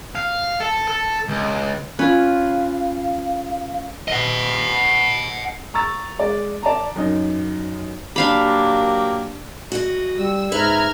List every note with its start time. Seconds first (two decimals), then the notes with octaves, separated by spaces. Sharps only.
0.15 F5
0.60 A4
0.88 A4
1.28 C#2
1.99 C#4 F4 B4 F5
4.08 D#5 F#5
5.74 A#5 C#6 E6 A6
6.18 G#3 D5
6.63 D5 A5 A#5
6.96 F#2 D#4
8.16 F#3 A#3 D4 G4 F5 B5
9.72 F#4 D#5
10.18 G3 E6
10.52 G#2 B4 E5 A#5 F6 G#6